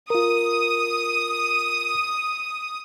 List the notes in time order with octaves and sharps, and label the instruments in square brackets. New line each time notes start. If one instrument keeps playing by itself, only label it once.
[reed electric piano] F4 A#4 [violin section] D#6